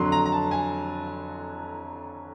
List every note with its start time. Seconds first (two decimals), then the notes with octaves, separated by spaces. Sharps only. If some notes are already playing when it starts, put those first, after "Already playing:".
Already playing: F2 D3 F#3 C6
0.12 A#5
0.26 A#5
0.32 A5
0.51 G#5